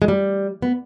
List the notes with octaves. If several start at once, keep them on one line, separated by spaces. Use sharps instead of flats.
G#3
G3
B3